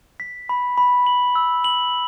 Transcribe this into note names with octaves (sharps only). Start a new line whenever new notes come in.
B6
B5
B5
F#7
E6
F#7